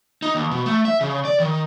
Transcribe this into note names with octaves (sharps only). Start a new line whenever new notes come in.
D#4
D#2
B2
A3
E5
C#3
D5
D#3